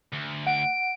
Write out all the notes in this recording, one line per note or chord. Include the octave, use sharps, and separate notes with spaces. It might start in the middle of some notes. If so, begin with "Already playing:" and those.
D2
F#5 D7